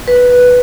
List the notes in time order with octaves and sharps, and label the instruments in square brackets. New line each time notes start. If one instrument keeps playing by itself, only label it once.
[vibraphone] B4